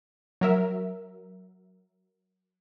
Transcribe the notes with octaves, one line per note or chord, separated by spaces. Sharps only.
F#3 A#4 E5